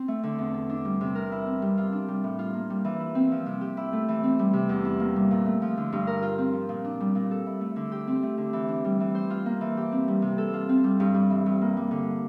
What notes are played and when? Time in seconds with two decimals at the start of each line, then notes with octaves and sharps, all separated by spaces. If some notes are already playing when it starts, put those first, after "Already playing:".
Already playing: C4
0.08 A3
0.23 D3
0.39 E2
0.54 A4
0.70 D4
0.85 G3
1.01 C3
1.15 A#4
1.32 E4
1.47 C4
1.62 G3
1.77 F4
1.92 D4
2.08 G3
2.24 A2
2.39 F4
2.54 A#3
2.70 G3
2.85 E3
3.00 E4
3.15 C4
3.32 F3
3.46 C3
3.61 G4
3.77 E4
3.93 A3
4.08 E3
4.23 C4
4.39 G3
4.53 C3
4.69 E2
4.85 E4
5.00 A#3
5.16 G3
5.31 A#2
5.46 A3
5.62 F3
5.77 D3
5.92 G2
6.07 A#4
6.22 F4
6.38 C4
6.53 F3
6.69 A#2
6.84 D4
7.00 G3
7.15 A#2
7.31 A4
7.47 E4
7.61 A3
7.76 D3
7.92 G4
8.07 C4
8.23 A3
8.38 D3
8.53 E3
8.68 D4
8.85 G3
9.00 E3
9.15 C5
9.30 F4
9.46 A#3
9.61 E3
9.77 G4
9.92 C4
10.08 G3
10.22 C3
10.38 A4
10.53 F4
10.69 C4
10.84 G3
11.00 G2
11.14 G3
11.30 E3
11.46 G2
11.61 A#3
11.77 G3
11.91 D3